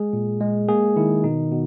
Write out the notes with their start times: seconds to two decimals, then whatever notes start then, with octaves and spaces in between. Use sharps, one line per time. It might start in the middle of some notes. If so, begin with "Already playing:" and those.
Already playing: G#3 G#4
0.13 A#2
0.41 G#3
0.68 A#3 G#4
0.96 D#3 E4
1.24 B2 D#4
1.51 B2